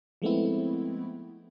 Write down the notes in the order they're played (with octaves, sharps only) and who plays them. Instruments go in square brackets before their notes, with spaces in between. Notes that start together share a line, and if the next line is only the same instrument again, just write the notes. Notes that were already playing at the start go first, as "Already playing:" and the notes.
[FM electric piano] F3 G#3 A3 B3 C4 E4